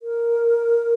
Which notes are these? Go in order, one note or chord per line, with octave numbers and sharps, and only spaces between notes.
A#4